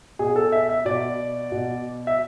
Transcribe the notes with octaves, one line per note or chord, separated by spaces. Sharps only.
B2 G#4
A4
E5
E5
B2 D5
B2
E5